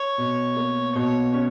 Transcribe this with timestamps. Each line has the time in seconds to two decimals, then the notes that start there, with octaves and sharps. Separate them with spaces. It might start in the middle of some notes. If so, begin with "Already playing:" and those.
Already playing: C#5
0.18 B2
0.56 A#3
0.95 B2 C#5
1.34 C#4